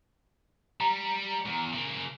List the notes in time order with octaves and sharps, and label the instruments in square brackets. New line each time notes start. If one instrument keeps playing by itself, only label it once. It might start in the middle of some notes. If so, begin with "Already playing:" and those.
[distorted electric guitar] G3 [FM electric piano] A#5 C#7
[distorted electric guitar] E2
C#3 A#3